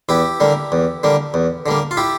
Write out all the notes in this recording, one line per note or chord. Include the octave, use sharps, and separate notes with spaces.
E2 E4 G4
D3 G3 A#3
E2
D3 G3 A#3
E2
D3 G3 A#3
F4
E4 G4